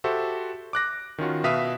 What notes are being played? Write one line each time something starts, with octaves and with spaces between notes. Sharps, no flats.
F#4 G4 A4 C5 E5
D6 F#6 A#6
D#3 C#4 F4 F#4
B2 B4 E5 F5 D#6 B6